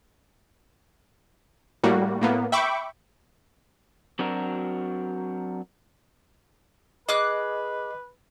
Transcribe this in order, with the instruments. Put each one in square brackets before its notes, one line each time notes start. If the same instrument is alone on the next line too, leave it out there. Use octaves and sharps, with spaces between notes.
[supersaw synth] A2 G3 A#3 F#4
A2 A#3 B3
E5 G5 B5 C#6 D6
[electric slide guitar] F#3 C4 D4 F#4 A#4
[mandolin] G#4 D6 F#6 [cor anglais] B4 [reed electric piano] D#5